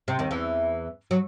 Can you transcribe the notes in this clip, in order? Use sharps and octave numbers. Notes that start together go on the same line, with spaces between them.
C3
D#2 D#3
E2 E3
F#3